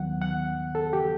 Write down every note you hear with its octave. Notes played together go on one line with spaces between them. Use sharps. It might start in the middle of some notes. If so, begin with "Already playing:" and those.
Already playing: D#2 D#3 F#3 B3 F#5
F#5
A4
G4